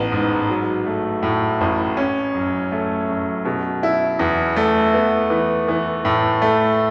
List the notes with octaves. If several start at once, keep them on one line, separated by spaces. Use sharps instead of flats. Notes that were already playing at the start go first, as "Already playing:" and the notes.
Already playing: A1 G#2 B3
G#2
F#3
A3
A2
A1
C#4
F#2
A3
F#2
B2
E4
E2
A3
B3
E3
E3
A2
A3